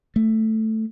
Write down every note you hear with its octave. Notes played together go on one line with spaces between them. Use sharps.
A3